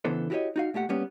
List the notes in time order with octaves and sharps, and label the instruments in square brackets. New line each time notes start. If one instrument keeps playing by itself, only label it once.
[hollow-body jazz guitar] C#3 E3 B3 D4 A4 C5
E4 F#4 G4 A4 C#5 D#5
D#4 F#4 F5
A#2 A3 G4 F#5
G3 A#3 B3 C#4 G4